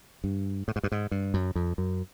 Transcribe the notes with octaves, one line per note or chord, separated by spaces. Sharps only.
G2
A2
G#2
G2
G#2
G2
F#2
F2
F#2